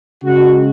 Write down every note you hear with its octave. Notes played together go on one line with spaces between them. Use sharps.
C#3 G#3 F#4